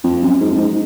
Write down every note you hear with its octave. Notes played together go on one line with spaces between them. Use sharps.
F2
F#2
G#2
F#2
G#2